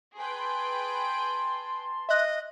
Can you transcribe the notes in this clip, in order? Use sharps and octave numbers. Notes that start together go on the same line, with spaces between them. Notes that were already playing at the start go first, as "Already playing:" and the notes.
G#4 B4 G5 A5 C6
D#5 E5 F#6